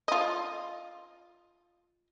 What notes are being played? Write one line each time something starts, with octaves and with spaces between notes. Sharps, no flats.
F4 D#5